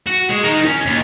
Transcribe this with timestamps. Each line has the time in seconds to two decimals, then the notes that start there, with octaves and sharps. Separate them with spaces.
0.06 F#4
0.30 G#3
0.43 D#4 A#4
0.66 C#4
0.86 D#2